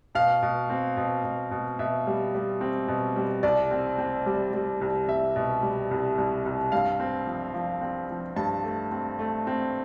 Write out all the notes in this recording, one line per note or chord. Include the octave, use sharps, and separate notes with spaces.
B2 F5
B2
C4
B2
B2
B2
B2 E5
G3
G3
C4
B2
G3
C2 D5
C4
C4
G3
G3
C2
C2 E5
B2
G3
C2
C2
C2
G2 F5
C4
F3
F3
C4
F3
G2 A5
A3
C4
A3
C4